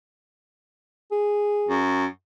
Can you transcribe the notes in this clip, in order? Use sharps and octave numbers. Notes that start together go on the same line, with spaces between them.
G#4
F#2